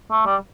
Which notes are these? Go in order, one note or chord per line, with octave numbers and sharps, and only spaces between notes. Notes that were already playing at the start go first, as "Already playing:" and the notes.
A3
G3